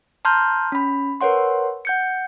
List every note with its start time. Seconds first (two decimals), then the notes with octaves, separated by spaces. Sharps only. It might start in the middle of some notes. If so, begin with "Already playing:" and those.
0.25 A5 A#5 C6 F6 G6
0.72 C#4 B5
1.21 A#4 B4 C#5 F#5 C6
1.85 F#5 G6 C#7